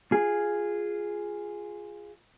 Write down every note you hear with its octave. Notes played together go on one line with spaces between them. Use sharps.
F4 G#4